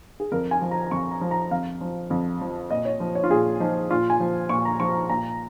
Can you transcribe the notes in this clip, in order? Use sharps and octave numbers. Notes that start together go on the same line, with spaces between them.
G#4
F2 A#4
G#5
F3
A#5
A#5
F2 C#6
A#5
F3
A#5
F2 F5
F3
F2
F3
A#2 D#5
C#5
F3
C#5
F4
A#2 G#4
F3 D#4
A#2 F4
G#5
F3
A#2 C#6
A#5
F3 C#6
A#5
A#2 A#5